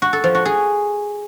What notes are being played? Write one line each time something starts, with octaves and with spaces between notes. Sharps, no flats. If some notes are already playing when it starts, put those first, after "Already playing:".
F#4
A4
F3
F#4
G#4